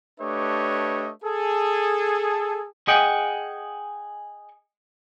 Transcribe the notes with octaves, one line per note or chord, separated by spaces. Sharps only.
A3 D4 G4 B4 C#5 D#5
G#4 A4
G#4 D#5 F#5 G5